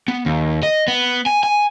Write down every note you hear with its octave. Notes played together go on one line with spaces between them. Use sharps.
B3
D#2
D#5
B3
G#5
G#5